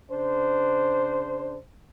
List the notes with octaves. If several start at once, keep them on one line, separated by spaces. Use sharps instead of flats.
C#3 D4 C5